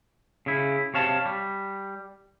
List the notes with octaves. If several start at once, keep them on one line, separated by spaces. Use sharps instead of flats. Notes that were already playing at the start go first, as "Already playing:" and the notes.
C#3 E4
C3 C#5 F5 A5
G3